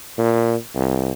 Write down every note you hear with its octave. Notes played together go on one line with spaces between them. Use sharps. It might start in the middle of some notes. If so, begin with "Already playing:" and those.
A#2
C2